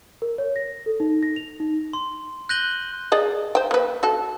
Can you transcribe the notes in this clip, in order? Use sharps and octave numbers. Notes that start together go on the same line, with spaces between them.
A#4
C#5
A#6
A4
D#4
A#6
F7
D#4
C6
F#6 G6 A#6 D#7 F#7 G7
G#4 D5 D#5
C5 G5
A#3 B4
F#4 A4